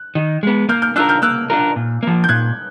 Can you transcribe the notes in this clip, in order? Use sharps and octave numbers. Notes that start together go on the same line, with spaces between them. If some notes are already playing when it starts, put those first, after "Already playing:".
Already playing: F#6
D#3
G#3 B3
A#3 F6 G6
F6 G6
D4 F4 A#4 E6 F#6
F6 G6
A#3 E6 F#6
D4 F4 A#4
A#2
F3 A#3
G6
A#2 F#6 G#6